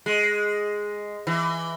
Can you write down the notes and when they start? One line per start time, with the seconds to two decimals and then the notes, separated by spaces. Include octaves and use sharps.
0.06 G#3
1.27 E3